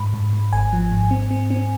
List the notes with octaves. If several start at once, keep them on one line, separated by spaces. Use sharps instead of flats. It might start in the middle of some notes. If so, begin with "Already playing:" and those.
Already playing: G#2 B5
G#2
G#2
G#1 G#5
F3
G#2
C4
C4
C4